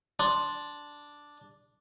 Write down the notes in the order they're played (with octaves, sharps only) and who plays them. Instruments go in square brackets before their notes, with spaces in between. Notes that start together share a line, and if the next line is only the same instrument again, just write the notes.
[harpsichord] D4 [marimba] C6